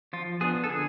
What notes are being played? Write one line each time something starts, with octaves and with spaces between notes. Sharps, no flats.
F3 F4
B3 D4 G#4
A4
D3 G#4